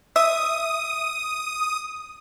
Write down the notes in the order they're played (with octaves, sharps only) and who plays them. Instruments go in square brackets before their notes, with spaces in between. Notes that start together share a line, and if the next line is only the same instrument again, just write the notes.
[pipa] E5 [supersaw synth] D#6